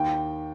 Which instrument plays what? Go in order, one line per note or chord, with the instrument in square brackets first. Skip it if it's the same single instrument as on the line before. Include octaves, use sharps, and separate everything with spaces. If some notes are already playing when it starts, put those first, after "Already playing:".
Already playing: [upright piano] D#2 G5